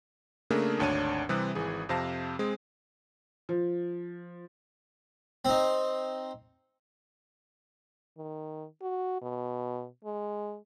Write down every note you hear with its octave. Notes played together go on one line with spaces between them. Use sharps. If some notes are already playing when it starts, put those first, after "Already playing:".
C#3 A3 A#3 D4 G#4 A#4
G#1 D2 D4 C#5 A5 D#7
C3 E3 G3 C4 D#6 F#6
G#1 E3 G#4
F2 C3 C5 F5 A5 A#6
G#3 C4 G#4
F3
C4 D#4
D#3
F#4
B2
G#3